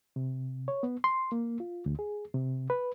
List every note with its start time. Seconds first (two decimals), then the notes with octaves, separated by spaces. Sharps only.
0.16 C3
0.68 C#5
0.83 B3
1.04 C6
1.32 A#3
1.60 F4
1.86 D2
1.99 G#4
2.34 C3
2.70 B4